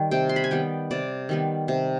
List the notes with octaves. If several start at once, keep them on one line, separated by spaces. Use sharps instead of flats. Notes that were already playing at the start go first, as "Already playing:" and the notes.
Already playing: D#3 G3
C3 G5
C6
B5
G#5
D#3 G3 B3 G5
C3 D5
D#3 G3 B3
C3